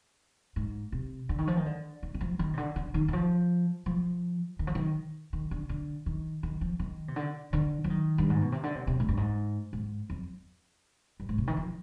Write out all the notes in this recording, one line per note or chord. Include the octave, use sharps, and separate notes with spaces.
G#2
C3
D3
D#3
F3
D#3
D3
D#3
D#3
F3
D#3
C3
D3
D3
D#3
D#3
F3
F3
D#3
F3
D#3
D#3
D3
D3
D#3
D#3
F3
D#3
C3
D3
D3
F3
D#3
G2
G#2
B2
C3
D3
C3
C3
G#2
G2
G#2
G#2
F2
G2
G#2
C3
D#3
F3